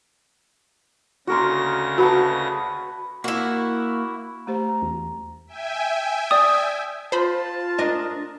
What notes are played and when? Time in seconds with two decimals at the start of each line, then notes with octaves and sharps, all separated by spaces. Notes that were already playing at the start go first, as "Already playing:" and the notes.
1.27 D2 C#3 F#4 A#4 C6 A#6
1.98 F#4 B4 F#5 A5
3.24 A#3 E4 F#4
4.47 A3 G4 C5 A#5
4.82 E2
5.47 E5 G5 G#5
6.31 D5 D#6
7.12 F4 C5 A5 B5
7.78 D4 A#4 D#5